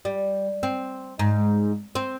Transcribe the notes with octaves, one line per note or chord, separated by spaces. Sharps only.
G3
C4
G#2
C4